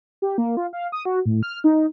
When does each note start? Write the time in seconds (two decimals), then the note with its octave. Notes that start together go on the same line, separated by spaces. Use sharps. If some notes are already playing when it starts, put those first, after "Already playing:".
0.22 G4
0.38 A#3
0.57 F4
0.73 F5
0.92 D#6
1.05 F#4
1.26 A2
1.43 F6
1.64 D#4